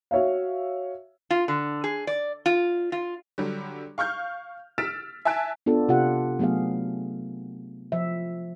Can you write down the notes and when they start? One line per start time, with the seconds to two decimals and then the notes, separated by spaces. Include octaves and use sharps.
0.11 F#4 C#5 E5 F5
1.30 F4
1.48 D3
1.84 G#4
2.07 D5
2.46 F4
2.92 F4
3.38 D3 F#3 G3
3.98 F5 C#6 F6 G6
4.78 E6 F6 A6 B6 D7 E7
5.25 E5 G#5 A5 F#6 D7
5.66 B3 D4 F4 A4
5.89 C3 F4 G4 F#5
6.39 F#3 A3 B3 G#4 F5
7.92 F3 E5